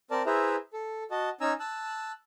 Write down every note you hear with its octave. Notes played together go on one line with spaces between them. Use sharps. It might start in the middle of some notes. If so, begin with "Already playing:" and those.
C4 A#4 D5 A5
E4 G#4 B4 C5 E5 A#5
A4
F#4 D#5 A5
C#4 D#4 G#5 A#5 E6
A5 E6 F#6